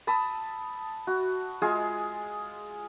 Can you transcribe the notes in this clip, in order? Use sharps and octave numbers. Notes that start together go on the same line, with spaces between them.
A5 B5 D#6 E6
F#4
G#3 F4 G#4